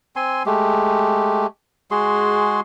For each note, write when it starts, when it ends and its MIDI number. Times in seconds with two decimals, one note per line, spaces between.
0.16 0.43 60
0.16 0.43 80
0.16 0.43 84
0.46 1.47 56
0.46 1.47 57
0.46 1.47 67
1.91 2.60 56
1.91 2.60 66
1.91 2.60 68
1.91 2.60 84